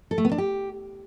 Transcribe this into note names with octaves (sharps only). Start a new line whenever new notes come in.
A4
A3
B3
D4
G4